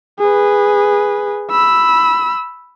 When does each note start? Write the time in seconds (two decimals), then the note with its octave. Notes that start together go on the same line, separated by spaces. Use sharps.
0.20 G#4 B4
1.51 B5 E6